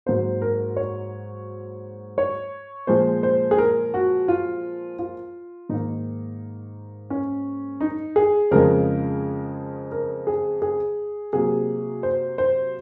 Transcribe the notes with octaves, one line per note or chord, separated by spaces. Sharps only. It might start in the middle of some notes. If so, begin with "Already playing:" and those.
G#2 F#3 A#3 C5
A#4
C#5
C#5
A#2 F3 G#3 C5
C5
G#4
A#4
F#4
F4
F4
G#2 D#3 A#3 D#4
C#4
D#4
G#4
F2 C#3 F3 G#3 A#4
A#4
G#4
G#4
C3 F#3 A#3 G#4
C5
C5